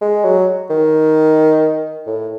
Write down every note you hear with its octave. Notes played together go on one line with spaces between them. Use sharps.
G#3
F#3
D#3
A2